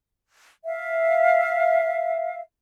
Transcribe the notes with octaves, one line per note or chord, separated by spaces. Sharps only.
E5 F5